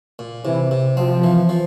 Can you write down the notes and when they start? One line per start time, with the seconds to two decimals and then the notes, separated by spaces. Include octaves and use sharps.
0.19 A#2
0.45 C3 E3
0.71 C3
0.97 F3 C4
1.23 E3
1.49 F3